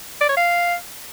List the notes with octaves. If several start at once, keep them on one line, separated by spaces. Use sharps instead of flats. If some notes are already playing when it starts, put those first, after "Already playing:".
D5
C#5
F5